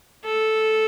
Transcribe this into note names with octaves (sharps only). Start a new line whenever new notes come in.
A4